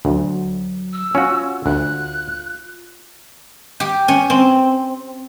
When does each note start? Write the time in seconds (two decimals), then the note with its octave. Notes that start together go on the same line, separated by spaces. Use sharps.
0.05 D2 F#3
0.93 E6
1.15 C#4 F4 F#4
1.66 D2 F#6
3.80 G4
4.08 C#4
4.30 C4